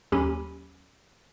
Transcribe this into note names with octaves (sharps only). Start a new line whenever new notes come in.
D#2 F#3 C#4 G4 B5 D#7